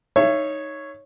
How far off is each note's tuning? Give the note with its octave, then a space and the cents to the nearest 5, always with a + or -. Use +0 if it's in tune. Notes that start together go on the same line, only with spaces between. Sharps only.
D#4 +0 C#5 +0 E5 +35